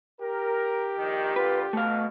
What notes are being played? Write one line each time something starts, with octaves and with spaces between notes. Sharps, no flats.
G4 A#4
A#1 D#3
A#2 D3 F4 B4
B2 A3 F5